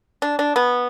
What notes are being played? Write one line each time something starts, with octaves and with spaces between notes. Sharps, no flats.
D4
D4
B3